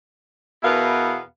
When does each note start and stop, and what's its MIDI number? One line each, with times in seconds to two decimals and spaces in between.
0.63 1.19 40
0.63 1.19 47
0.63 1.19 59
0.63 1.19 64
0.63 1.19 70
0.63 1.19 77